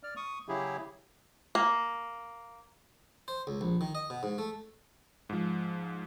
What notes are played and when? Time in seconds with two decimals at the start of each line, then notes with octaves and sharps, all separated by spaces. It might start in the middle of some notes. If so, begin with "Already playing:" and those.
0.03 D5 F6
0.16 C#6 D#6
0.48 C#3 F#3 E4 G4 G#4
1.55 A#3
3.28 C5
3.47 C#2
3.61 A#1
3.81 D#3
3.95 D#5
4.10 B2
4.23 G#2
4.38 A3
5.29 G#2 F3